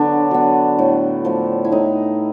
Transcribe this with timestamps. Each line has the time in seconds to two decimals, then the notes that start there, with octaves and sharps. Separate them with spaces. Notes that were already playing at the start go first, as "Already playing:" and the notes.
Already playing: D3 F#3 B3 D4
0.31 F#3 B3
0.79 A2
1.25 F3 A3
1.65 E4
1.72 A2 D#4